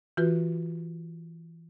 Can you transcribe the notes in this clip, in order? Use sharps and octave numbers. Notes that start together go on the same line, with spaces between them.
E3 F4 F#4 B4